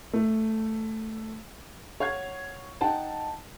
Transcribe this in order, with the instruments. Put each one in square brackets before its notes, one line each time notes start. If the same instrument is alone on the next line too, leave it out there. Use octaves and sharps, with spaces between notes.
[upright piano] A3
C#5 F5 F#5 G#6
D#4 F#5 G5 A5